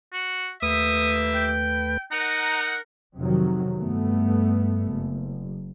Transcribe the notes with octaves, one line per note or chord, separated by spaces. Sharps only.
F#4
D#2 A3 A#3 G4 B4 E5 D#6
G5
D#4 A#4 F#5 A#5
F2 C3 D#3 F#3
G2 A3 B3
F#1